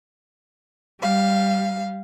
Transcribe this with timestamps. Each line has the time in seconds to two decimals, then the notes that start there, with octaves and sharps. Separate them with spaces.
1.00 G3 F5